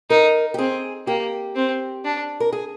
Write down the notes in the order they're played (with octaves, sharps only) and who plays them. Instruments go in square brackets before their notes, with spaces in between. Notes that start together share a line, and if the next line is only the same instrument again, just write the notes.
[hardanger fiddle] D#4 [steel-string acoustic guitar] A#4
[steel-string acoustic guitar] G4
[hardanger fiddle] C4 [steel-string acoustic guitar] G#4
[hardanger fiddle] A#3 [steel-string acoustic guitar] G4
[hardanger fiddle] C4
D4
[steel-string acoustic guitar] A#4
G#4